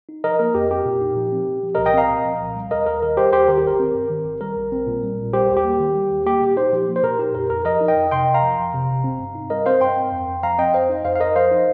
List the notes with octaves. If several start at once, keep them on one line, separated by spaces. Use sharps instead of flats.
D#4
F3 A#4 D#5
A#3 A#4
F2 G4
C4 G4
A#2
D#4
F3
C4
A#2
F3
C2 A#4 D#5
D#5 G5
C4 F5 A#5
A#2
F3
C2
G3
D#2 A#4 D#5
D#2 A#4
D#3 A#4
G3 G4 C5
D#2 G4 C5
D#3 A#4
G4
G1 A#4
C4
G2
D#3
G1
G3 A#4
A#1
C4
A#2
G3
A#1
G3 G4 C5
D#2
G4
A#3
D#3
G3
D#2
A#3 G4
A#2
D#4 G4 C5
F3
A#3
C5
A#2 A#4
D#4 G4
F2 A#4
F2 A#4
F3 A#4 D#5
D#4
D#5 G5
F2
C3 G5 C6
G1
F5 A#5
F3
F2
C3
G1
C4
G2
D#4
G3 A#4 D#5
C4 C5 F5
G2 G5 C6
C4
F2
F2
F3 F5 A#5
C4 D#5 G5
F2 C5 F5
D#4
F2 C5 F5
F5
F2 A#4 D#5
F3 C5 F5
D#4